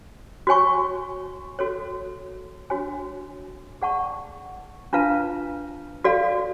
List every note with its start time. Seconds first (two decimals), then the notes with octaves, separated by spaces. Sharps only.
0.47 F#4 C#5 G#5 C#6
1.59 F#4 A4 C#5
2.70 D4 F#4 C#5 G#5
3.82 G#4 D5 F#5 A5 C#6
4.93 D4 F4 B4 F5 A5
6.04 F#4 A4 D5 F5